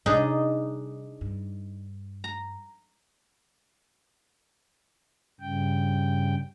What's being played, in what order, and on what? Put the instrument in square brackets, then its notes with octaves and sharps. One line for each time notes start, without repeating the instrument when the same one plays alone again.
[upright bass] C3 G3 [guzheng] D4 G#4 [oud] D#4
[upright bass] G2
[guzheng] A#5
[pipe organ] G2 C#3 G5